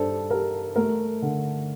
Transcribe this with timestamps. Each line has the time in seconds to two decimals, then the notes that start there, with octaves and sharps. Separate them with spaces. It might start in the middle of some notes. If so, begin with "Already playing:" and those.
Already playing: G2 D4 A4 C5
0.30 G3 A#4
0.76 A3 A#4
1.22 D3